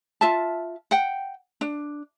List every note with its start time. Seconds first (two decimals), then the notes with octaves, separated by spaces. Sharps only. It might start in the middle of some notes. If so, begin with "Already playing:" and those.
0.21 F4 E5 A5
0.91 F#5 G5
1.61 D4